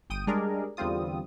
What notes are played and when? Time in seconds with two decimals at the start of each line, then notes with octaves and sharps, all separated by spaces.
0.10 G1 G5 D#6 D#7
0.27 G3 G#3 D4 G#4 A#4 D5
0.77 E2 D3 G3 C4 F4 D#6